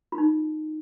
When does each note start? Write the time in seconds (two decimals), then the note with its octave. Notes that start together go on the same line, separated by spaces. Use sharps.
0.12 F4
0.18 D#4